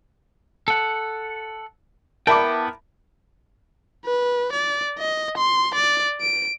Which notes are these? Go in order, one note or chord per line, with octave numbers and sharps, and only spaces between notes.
A4 F#5
B3 E4 A#4 E5 G5 A5 B5 D6
B4
D5
D#5
C6
D5
D7